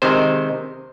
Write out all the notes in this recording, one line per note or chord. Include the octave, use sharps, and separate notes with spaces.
C3 D#3 G#3 C5